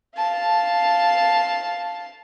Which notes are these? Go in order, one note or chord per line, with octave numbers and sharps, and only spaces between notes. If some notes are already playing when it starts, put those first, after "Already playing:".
F5 A5